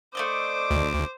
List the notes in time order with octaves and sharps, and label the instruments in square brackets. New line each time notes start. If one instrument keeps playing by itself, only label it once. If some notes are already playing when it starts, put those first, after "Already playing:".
[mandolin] A3 D4 D#5 [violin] C5 [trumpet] D6
[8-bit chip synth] D2